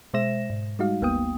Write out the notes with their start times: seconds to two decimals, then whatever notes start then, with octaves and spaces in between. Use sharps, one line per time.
0.14 B2 G#3 C5 E5 A#6 E7
0.50 G#2
0.79 G3 G#3 D#4 F#4 F5
1.01 G1 D2 A#3 B3 G5 D#6